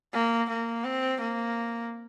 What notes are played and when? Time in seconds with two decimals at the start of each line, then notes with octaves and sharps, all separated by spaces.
0.13 A#3
0.49 A#3
0.84 C4
1.20 A#3